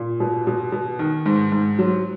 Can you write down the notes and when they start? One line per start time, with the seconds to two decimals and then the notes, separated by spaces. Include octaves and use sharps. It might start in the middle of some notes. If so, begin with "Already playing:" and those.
Already playing: A#2
0.20 B2
0.47 B2
0.72 B2
0.99 D#3
1.26 G#2
1.52 G#2
1.79 F#3